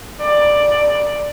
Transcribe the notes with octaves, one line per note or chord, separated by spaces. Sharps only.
D5